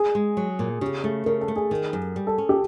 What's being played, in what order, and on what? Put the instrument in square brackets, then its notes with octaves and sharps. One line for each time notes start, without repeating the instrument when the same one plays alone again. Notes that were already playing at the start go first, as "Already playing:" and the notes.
Already playing: [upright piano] G#4
[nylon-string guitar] G#3
F#3
A#2
[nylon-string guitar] C#3 [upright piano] G4
[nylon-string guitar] A3 [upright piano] G#4
[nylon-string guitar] C#3 [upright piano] A#4
[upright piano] A4
[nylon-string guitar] A3
[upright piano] G#4
[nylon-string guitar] D#3
F#2
G3
[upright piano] A4
[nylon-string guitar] C#4
[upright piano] G4